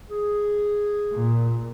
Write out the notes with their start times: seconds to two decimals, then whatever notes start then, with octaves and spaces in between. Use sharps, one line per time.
0.11 G#4
1.13 A#2